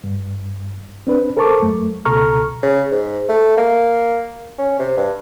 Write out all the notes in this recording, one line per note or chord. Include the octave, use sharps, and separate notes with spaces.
G2
C4 D4 B4
A4 A#4 C5 A5 C#6 D6
F#2 A3
C#2 B2 A4 A#5 C#6 F6
C#3
G#2
A3
A#3
C#4
C3
G2